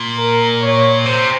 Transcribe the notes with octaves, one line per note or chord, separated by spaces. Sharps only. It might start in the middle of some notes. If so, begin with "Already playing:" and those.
Already playing: A#2
A#4
C#5
C3 C5